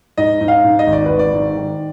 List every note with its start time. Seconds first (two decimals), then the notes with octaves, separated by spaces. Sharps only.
0.18 G#2 D#5
0.41 G#2
0.48 F5
0.64 G#2
0.79 D#5
0.87 G#1
0.93 D5
1.06 G#1 B4
1.19 D5
1.33 G#2
1.56 D#3